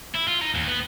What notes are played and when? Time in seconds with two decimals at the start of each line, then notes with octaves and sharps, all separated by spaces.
0.15 E4
0.28 F4
0.41 D#4
0.55 D#2
0.67 B3